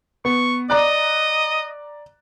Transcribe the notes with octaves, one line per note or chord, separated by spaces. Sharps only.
B3 C#6
D5 D#5 A#5 F#6